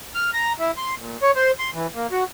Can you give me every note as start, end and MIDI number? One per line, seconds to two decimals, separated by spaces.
0.15 0.30 89
0.33 0.53 82
0.59 0.71 64
0.77 0.95 84
0.98 1.17 46
1.22 1.31 73
1.36 1.51 72
1.59 1.71 84
1.74 1.87 52
1.95 2.07 58
2.12 2.24 66